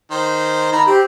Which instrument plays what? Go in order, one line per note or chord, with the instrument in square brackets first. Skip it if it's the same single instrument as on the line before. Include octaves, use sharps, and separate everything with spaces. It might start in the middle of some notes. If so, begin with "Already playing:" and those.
[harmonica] D#3 C5
D#3 A#5 B5
[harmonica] C4 [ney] G4